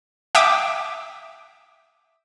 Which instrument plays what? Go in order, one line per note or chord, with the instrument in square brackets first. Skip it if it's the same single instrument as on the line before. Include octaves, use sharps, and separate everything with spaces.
[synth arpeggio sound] E5 G5 D6 D#6